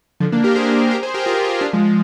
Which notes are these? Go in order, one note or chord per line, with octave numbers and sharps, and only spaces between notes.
D3 F3
A#3 D4
G4 A#4
G#4 C5
G4 A#4
G#4 C5
G4 A#4
F4 G#4
F4 G#4
D4 F4
F3 G#3
F3 G#3